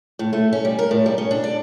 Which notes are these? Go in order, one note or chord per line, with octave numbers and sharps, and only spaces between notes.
A2
A3
C#4
G3
A#4
A2
G3
C#4
D4
D5